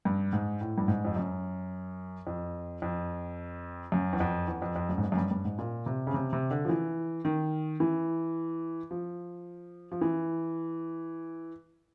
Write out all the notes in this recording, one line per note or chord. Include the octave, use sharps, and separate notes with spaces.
G2
G#2
A2
G2
G#2
F2
F#2
F2
F2
F#2
E2
F2
E2
F2
F2
F#2
G#2
G2
F#2
G2
G2
G#2
A#2
C3
C#3
C3
C3
D3
F3
E3
D#3
E3
F3
F3
E3